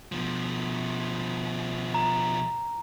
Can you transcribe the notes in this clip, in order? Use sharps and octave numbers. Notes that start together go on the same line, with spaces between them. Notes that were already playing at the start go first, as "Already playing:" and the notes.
B2 F3
A#5